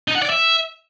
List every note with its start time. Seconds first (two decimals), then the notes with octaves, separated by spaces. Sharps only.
0.08 D#4
0.15 F#5
0.22 D5
0.30 E5